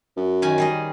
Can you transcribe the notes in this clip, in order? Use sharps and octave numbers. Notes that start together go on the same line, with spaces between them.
F#2
D#3 C#4 G#5
G3 G#4 D#5